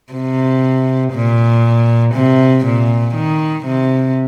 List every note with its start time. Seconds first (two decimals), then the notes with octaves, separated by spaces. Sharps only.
0.13 C3
1.13 A#2
2.14 C3
2.66 A#2
3.15 D#3
3.66 C3